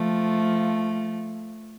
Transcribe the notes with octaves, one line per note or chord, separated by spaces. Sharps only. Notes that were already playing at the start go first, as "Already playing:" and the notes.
Already playing: F3 A3